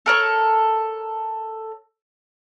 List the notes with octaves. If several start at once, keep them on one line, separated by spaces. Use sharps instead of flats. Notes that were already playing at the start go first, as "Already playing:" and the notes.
A4 A#4 C#5